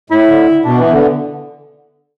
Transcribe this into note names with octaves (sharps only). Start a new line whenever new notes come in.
A2 E4
D3
B2 D4
E3 B3
D3